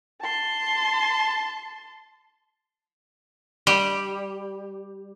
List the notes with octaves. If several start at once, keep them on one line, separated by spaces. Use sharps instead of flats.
A5 C6
G3